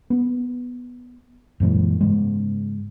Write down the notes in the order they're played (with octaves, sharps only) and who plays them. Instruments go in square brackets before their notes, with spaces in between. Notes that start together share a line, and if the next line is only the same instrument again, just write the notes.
[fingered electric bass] B3
F#2 A#2 E3 G#3
G#2 C#3 G#3